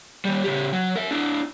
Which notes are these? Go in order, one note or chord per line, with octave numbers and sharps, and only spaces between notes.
D#3 G3
C#3 G4
F#3
A#4 E5
D4 E4